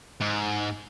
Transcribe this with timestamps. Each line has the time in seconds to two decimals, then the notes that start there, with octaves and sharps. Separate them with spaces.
0.21 G#2